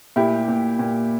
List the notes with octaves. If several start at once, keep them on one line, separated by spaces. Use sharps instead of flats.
A#2 E4 G4
A#2
A#2